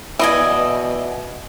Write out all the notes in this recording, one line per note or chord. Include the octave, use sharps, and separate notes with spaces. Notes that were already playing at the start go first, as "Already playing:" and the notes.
B2 E3 D5 D#5 G#5